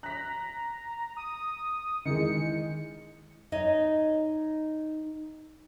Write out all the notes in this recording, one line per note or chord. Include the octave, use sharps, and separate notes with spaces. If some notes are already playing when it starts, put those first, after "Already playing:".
A#5 F#6 B6
D#6
D#3 E3 G#3 C#7
D#4 C#5 D#5